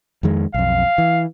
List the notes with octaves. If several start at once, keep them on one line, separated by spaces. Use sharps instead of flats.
F2 D#3 G#3
B1 F2 F5
E3